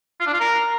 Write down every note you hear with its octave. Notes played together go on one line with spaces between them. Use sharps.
F4
D4
F4
A#4